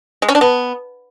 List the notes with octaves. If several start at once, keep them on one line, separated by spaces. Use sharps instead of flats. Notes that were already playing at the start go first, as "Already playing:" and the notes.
G#3
C#4
D4
B3